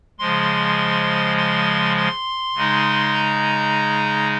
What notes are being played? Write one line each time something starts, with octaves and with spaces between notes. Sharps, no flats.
C#3 F3 G#3 C6
C6
C6
C#3 G#3 D#4
A#5